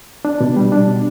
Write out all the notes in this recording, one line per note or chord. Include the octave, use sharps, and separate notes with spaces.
D4
B2
G3
D4
B2